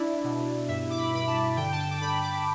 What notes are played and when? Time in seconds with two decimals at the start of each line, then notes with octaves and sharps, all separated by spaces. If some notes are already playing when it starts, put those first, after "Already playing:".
Already playing: D4 E4 D5
0.24 B2
0.68 G2 E5
0.90 D6
0.98 B5
1.13 G2 B5
1.27 A5
1.57 D3 G5
1.72 A5
1.79 G5
1.91 D6
2.01 D3 B5
2.23 D6